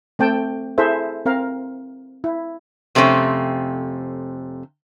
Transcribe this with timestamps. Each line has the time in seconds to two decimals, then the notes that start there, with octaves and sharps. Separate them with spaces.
0.19 A3 C4 G5 A5
0.78 E4 G#4 A4 C5 E5
1.26 C4 A#4 F5
2.24 E4
2.95 F2 C3 A3 C4 C#4